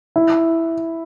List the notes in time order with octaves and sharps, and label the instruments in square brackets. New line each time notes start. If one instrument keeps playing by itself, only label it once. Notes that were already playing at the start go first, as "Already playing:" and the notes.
[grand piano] E4